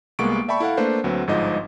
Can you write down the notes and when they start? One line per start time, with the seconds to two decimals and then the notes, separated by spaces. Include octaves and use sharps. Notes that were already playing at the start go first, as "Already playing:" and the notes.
0.19 C2 G#3 A#3 B3 C#6 D7
0.48 D5 E5 G5 A5 B5 C#6
0.60 E4 A4 F5 F#5
0.77 A3 A#3 D4 B4 C5
1.04 D2 F#3 C4 B4
1.27 G1 G#2 F3 D#5